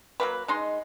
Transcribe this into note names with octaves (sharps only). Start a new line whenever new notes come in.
F#3 A#3 B4
G#3 D#4 C6